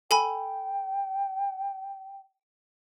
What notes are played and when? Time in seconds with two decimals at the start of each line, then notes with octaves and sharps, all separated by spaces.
0.11 A4 G5 G#5 B5